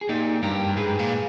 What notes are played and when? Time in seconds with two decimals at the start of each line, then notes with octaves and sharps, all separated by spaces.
0.01 G#4
0.09 A#2 D#4 G4
0.43 G2 G4 A#4
0.67 G2
0.77 G#2 G#4 B4
0.99 A#2